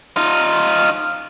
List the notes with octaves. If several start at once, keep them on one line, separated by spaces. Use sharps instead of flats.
D#4 F4